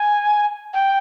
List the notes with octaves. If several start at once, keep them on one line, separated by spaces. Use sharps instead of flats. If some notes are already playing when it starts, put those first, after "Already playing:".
Already playing: G#5
G5